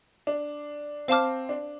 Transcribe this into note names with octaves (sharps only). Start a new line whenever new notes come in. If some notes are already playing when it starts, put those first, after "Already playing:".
D4
C4 C5 F5 A5 D6 F6
D4